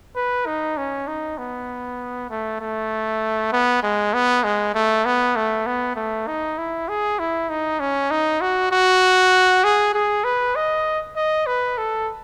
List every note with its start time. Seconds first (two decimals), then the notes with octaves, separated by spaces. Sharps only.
0.16 B4
0.47 D#4
0.78 C#4
1.08 D#4
1.38 B3
2.30 A3
2.61 A3
3.53 B3
3.83 G#3
4.14 B3
4.44 G#3
4.75 A3
5.05 B3
5.36 A3
5.66 B3
5.96 A3
6.28 D#4
6.58 E4
6.89 G#4
7.19 E4
7.50 D#4
7.80 C#4
8.11 D#4
8.41 F#4
8.72 F#4
9.64 G#4
9.94 G#4
10.24 B4
10.56 D#5
11.17 D#5
11.47 B4
11.78 A4